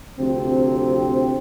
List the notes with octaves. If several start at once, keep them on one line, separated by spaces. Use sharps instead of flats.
D2 C3 F3 C4